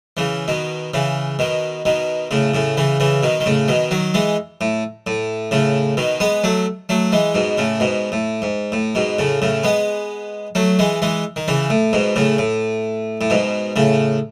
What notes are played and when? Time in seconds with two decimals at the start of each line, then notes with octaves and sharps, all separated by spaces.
0.17 C#3 E3
0.48 B2 D#3
0.94 C#3 E3
1.39 B2 D#3
1.85 B2 D#3
2.31 A2 C#3
2.54 A2 C#3
2.77 C#3 E3
3.00 C#3 E3
3.23 B2 D#3
3.40 D#3
3.46 A2 C#3
3.68 B2 D#3
3.91 D#3 F#3
4.14 E3 G#3
4.61 A2
5.07 A2
5.51 A2 C#3
5.97 B2 D#3
6.20 G#3 B3
6.44 F#3 A3
6.89 F#3 A3
7.12 E3 G#3
7.35 G#2 B2
7.58 A2 C#3
7.80 G#2 B2
8.12 A2
8.42 G#2
8.72 A2
8.95 G#2 B2
9.18 A2 C#3
9.42 A2 C#3
9.64 G#3 B3
10.55 F#3 A3
10.79 E3 G#3
11.02 E3 G#3
11.36 D#3
11.48 C#3 E3
11.70 A2
11.93 G#2 B2
12.16 A2 C#3
12.38 A2
13.21 A2
13.30 G#2 B2
13.76 A2 C#3